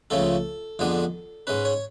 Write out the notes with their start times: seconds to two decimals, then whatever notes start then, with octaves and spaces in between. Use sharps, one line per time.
0.10 C#2 C#3 F3 A3 C#4 A4
0.79 F2 D3 G#3 B3 D4
1.47 G#2 G#3 C#4 B4
1.65 C#5